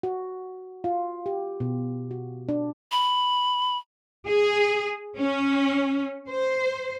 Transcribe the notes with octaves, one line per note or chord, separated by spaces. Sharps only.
F#4
F4
G4
B2
F#4
D4
B5
G#4
C#4
C5